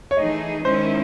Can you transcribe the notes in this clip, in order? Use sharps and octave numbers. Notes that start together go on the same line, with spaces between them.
C#5
E3 A3 D#4 G#4 D#5
D#3 G#3 C#4 E4 C5